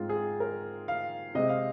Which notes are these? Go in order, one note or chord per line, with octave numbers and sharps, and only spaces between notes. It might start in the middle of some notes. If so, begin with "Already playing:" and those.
Already playing: G#2 G#3 C4 F4
G#4
A#4
F5
C3 G#3 C4 D#5
F5